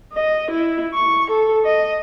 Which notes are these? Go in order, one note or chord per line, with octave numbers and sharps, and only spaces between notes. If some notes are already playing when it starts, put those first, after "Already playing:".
D#5
E4
C#6
A4
D#5